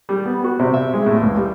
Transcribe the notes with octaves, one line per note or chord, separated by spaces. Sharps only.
G3
B3
F#4
C3
E5
G#3
A2
C#2
G3